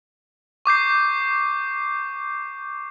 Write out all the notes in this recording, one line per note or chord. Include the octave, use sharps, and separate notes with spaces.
C#6 D6 G6 C7